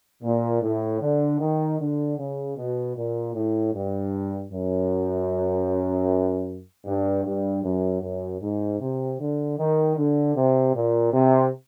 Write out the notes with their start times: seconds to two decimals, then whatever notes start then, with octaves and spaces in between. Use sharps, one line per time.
0.23 A#2
0.62 A2
1.01 D3
1.40 D#3
1.79 D3
2.18 C#3
2.57 B2
2.96 A#2
3.35 A2
3.74 G2
4.52 F#2
6.85 G2
7.25 G2
7.63 F#2
8.02 F#2
8.41 G#2
8.80 C3
9.19 D3
9.58 D#3
9.97 D3
10.36 C3
10.75 A#2
11.13 C3